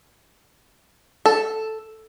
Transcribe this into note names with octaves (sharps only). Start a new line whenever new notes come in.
A4